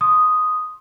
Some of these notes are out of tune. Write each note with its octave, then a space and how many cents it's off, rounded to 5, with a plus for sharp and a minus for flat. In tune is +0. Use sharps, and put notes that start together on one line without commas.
C6 +15 D#6 +0